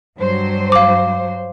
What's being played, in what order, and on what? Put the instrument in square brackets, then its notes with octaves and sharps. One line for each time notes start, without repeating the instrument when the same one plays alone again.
[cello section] G2 F#3 C5
[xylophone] F5 D6